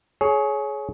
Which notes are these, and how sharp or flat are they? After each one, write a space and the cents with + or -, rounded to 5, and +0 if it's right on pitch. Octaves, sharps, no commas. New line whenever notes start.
G#4 +25 C#5 +0